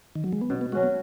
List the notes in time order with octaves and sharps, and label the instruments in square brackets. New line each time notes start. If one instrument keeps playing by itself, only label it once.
[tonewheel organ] D#3
F#3
G#3
B3
[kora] B2 [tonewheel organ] C#4
[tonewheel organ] B3
[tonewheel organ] G#3 [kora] F#4
[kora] F#3 C#4
[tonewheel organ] B3